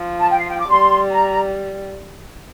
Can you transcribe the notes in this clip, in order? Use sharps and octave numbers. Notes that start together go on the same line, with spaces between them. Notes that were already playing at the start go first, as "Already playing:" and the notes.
Already playing: F3
A5
G5
F5
G5
D6
G3 C6
A#5